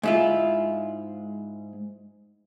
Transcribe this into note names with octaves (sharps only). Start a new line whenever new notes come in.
G#2 E4 F4